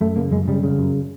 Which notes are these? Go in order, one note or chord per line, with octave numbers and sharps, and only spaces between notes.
F#2 A3
C#3 A#3
F#2 G#3
C#3 G3
C#3
F#2